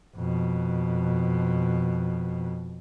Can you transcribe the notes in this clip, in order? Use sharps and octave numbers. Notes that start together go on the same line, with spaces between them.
F2 B2